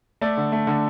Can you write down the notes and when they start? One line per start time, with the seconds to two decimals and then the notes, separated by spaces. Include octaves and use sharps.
0.21 A3 D5
0.37 D3
0.52 A3
0.67 D3